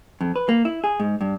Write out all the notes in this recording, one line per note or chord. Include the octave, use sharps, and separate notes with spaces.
F2
B4
A#3
E4
G#4
G#2
G2